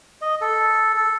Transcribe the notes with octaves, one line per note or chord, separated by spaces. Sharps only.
D#5
A4
A4